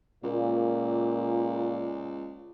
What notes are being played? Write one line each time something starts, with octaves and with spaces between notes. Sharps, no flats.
C#2 A#2